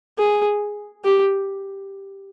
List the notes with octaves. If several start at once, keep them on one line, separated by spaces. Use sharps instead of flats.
G#4
G4